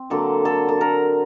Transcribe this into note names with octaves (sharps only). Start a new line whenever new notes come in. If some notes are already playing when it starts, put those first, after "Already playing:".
Already playing: C4
D3 F#3 A#3 A4
A4
A4
A#4